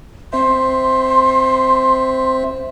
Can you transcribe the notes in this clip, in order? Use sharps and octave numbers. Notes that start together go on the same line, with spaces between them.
C4 C5 E5 C6